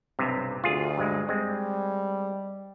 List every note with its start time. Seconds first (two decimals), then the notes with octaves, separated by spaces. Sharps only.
0.19 B1 G2 C3
0.64 D2 F4 G#4
0.98 G2 G#3
1.29 G3 G#3 C4